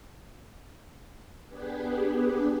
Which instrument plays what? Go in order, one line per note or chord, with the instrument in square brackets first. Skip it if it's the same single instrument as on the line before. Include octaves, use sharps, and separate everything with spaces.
[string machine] B3 D4 G4 G#4 B4